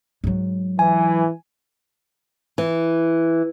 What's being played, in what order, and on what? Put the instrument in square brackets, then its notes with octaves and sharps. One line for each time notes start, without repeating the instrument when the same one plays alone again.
[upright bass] G#2 F#3
[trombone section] E3 [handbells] G#5
[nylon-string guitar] E3